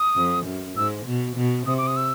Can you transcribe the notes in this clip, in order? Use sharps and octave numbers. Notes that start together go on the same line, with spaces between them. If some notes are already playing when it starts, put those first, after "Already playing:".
Already playing: D#6
F2
F#2
G#2 E6
B2
B2
C3 D#6
D6
D#6
E6